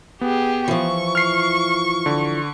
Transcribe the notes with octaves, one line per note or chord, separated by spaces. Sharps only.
B3 G4 G#4
E3 F3 C#6
F6 C7
D3